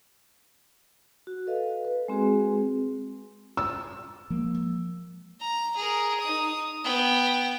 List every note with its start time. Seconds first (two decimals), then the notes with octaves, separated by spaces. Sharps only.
1.27 F#4
1.47 A4 B4 D#5 F5
1.85 B4
2.08 G#3 C4 F#4 G#4
3.57 E6
4.30 F3 G#3 A#3
5.40 A#5
5.76 G#4 A#4
6.20 D#4 D#6
6.84 B3 G5